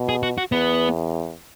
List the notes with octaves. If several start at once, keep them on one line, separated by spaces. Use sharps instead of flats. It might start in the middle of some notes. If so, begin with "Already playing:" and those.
Already playing: B2
G#4
F#4
F#4
E2 B3